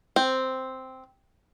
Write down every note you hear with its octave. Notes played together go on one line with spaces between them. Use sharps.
C4